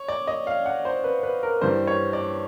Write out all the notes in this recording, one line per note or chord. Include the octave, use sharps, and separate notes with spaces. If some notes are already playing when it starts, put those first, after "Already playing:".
Already playing: C#5
D5
D#5
F5
F#5
C5
B4
B4
A#4
G2 E3 G3 C5
C#5
D5